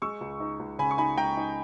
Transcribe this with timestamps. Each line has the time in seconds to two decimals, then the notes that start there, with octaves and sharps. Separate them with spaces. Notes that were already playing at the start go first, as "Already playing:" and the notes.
0.02 G#3 C#6 E6
0.21 C#2
0.40 D#4
0.59 C#2
0.79 C#3 G#5 B5
0.91 C#6
0.98 D#4 G#5 B5
1.17 C#2 G5 A#5
1.37 D#4